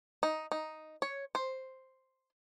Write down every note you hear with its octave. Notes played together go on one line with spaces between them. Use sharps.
D#4
D#4
C#5
C5